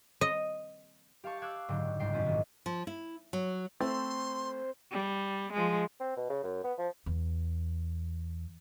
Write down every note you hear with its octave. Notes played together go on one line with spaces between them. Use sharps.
D#5
G4 F5 A5 C#6
F5 D6 E6 F#6 G#6
F#1 G#2 D3 G5
G1 C#2 G#2 G5 C7
F#2 B2 C#4 E4 D6
A#1 G#2 D#3
F3
E4
F#3
A3 C4 C5 C6
G3
F3 G#3
C4
B2
C#3
F#2
B3
F3
E2